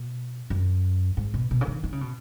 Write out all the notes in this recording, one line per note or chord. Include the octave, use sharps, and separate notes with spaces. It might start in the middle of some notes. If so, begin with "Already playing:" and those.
Already playing: B2
F#2
G#2
B2
B2
C#3
D#3
D#3
C#3
B2